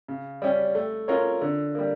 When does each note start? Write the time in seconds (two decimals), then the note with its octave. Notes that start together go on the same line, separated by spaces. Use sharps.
0.08 C#3
0.42 G3 C#4 G4
0.75 A3
1.08 C#4 F4 A#4 C#5
1.41 D3
1.75 G3 A#3